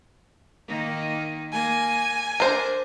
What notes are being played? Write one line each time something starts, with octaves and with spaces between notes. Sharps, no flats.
D#3 A#3 D#4
A#3 G#5
D4 A#4 C5